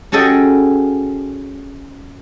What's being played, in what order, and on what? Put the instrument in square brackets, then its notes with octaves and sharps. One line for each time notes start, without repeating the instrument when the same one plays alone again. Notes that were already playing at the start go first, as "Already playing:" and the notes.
[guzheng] C#4 F#4 G#4 A4 D#5 G5